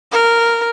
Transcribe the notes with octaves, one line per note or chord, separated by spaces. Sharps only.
A#4